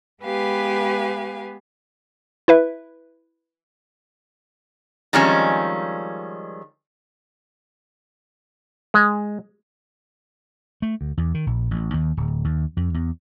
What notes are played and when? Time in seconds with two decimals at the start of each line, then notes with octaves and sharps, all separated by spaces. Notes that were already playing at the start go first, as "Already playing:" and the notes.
0.22 G#3 B3 G4 B4 F5 G#5
2.48 E4 B4 E5
5.13 D#3 F3 G3 G#3 C4 C#4
8.94 G#3
10.82 A3
11.01 D2
11.17 E2
11.34 D#3
11.47 A#1
11.71 A1
11.94 D#2
12.17 D1
12.44 D#2
12.77 F2
12.94 E2